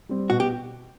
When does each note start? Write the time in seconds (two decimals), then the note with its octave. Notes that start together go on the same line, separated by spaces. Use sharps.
0.09 G3 C4
0.30 B2 F#4
0.40 G4